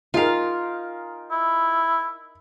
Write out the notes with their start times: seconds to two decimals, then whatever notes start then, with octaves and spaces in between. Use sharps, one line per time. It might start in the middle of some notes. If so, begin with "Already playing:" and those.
0.14 D#4 F4 G#4 A#4 F5
1.31 E4